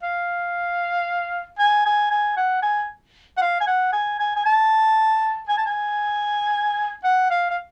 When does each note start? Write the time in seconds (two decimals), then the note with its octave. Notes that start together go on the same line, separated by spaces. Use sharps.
0.02 F5
1.58 G#5
1.85 G#5
2.10 G#5
2.37 F#5
2.62 G#5
3.37 F#5
3.41 F5
3.60 G#5
3.67 F#5
3.92 G#5
4.19 G#5
4.36 G#5
4.45 A5
5.48 G#5
5.58 A5
5.66 G#5
7.04 F#5
7.30 F5
7.50 F5